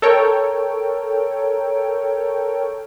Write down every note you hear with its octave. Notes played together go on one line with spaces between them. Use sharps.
A4 A#4 C#5 G5